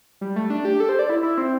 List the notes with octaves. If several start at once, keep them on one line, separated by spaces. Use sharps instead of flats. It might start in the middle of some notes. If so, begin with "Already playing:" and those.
G3
A3
D4
G4
A4
C5
D5
E4
E4
C4